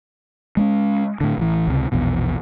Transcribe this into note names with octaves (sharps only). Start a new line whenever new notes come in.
G#3 A#3 C#4
A2 D3
A1 E3
C#2 C3
A#1 E2 B2